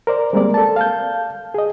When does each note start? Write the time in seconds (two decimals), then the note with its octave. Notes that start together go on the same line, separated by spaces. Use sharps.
0.07 A#4 C5 D5
0.33 G3 G#3 A#3 C4 A#4 D5
0.54 A4 A5
0.76 F5 A5 G6
1.54 G#4 D#5